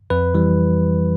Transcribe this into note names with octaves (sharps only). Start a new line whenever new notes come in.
F2 B4
E3 G3